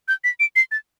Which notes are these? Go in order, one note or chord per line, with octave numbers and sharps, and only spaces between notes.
G6
B6
D7
C7
A6